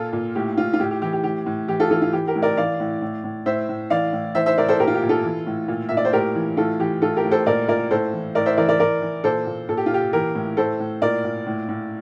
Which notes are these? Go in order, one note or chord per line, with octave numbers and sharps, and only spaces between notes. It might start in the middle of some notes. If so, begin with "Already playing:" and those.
Already playing: A#2 F4 A4
A#2
A2 G4
A2 F4
F4
A2 G4
G4
E3 G4
G4
A2 G4
A2
E3 G4
F4 A4
E3 F4 A4
F4
E3 G4
G4 A#4
A2
A#4 D5
E3 D5 F5
A2
A2
A2
A2 C5 E5
A2
E3 D5 F5
A2
E3 C5 E5
C5 E5
A2 A#4 D5
A4 C5
A#2 G4 A#4
F4
G4
A#2
F4 A4
E3
A2
A#2
A#2 E5
D5
C5
A2 G4 A#4
E3
A2 F4 A4
E3 G4
A2 F4 A4
G4 A#4
A2
A4 C5
A#2 A#4 D5
A#2 A#4 D5
A2 A4 C5
E3
A2 A#4 D5
C5 E5
E3 A#4 D5
A#4 D5
E3 A#4 D5
E3
A#2 A4 C5
A#2
A#2 A4
G4
F4
A#2 G4
E3 G4 A#4
A2
A2 A4 C5
A2
A#2 A#4 D5
A#2
A2
A2